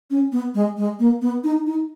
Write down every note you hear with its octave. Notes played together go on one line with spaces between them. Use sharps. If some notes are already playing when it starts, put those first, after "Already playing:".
C#4
B3
G#3
G#3
A#3
B3
D#4
D#4